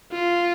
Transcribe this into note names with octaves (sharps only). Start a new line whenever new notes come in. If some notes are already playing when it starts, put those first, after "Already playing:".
F4